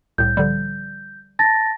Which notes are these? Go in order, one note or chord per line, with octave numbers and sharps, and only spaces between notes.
C2 A2 G6
D3 F3 G3
A5 A6 A#6